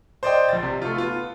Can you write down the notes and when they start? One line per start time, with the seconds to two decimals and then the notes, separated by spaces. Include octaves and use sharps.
0.23 C5 D5 D#5 G5
0.49 A#1 A6
0.63 C3
0.82 A3 F4
0.96 B3 F4